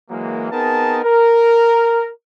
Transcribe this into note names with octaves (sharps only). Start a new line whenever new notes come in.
E3 F#3 G#3 A#3
B3 C4 D#4 G#4 A#4 A5
A#4